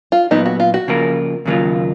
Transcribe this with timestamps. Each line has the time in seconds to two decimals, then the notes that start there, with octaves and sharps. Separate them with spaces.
0.12 F4
0.31 A#2 F#3 B3 D#4
0.46 F#4
0.60 F4
0.74 F#4
0.88 C#3 F3 A#3 F4 A#4
1.45 D#2 C#3 F#3 A#3 F4